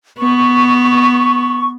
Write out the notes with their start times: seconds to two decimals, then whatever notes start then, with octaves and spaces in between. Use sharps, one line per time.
0.19 B3 C#6